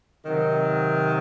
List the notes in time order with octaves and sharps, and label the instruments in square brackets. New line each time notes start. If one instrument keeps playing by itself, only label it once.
[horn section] C3 D#3 F#3